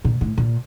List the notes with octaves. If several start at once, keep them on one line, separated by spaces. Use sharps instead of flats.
A#2
A2
A#2